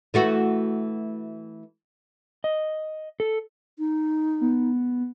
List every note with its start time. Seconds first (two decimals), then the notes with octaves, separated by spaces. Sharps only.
0.14 E3 A3 F#4
2.44 D#5
3.20 A4
3.79 D#4
4.41 B3